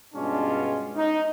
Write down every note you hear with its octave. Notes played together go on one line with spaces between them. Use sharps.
G2 B2 G#3 C#4 D4 F4
D#4